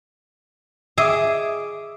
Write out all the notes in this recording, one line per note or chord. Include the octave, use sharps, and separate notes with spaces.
G#4 D#5 E5 D6